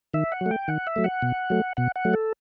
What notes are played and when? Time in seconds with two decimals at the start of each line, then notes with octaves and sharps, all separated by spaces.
0.14 D#3 E5
0.32 F#5
0.41 F#3
0.46 A3
0.51 G5
0.68 D#3 F#5
0.87 E5
0.96 F#3 A3
1.04 F#5
1.22 B2
1.50 F#3 A3
1.77 B2 F#5
1.96 F#5
2.05 F#3 A3
2.13 A4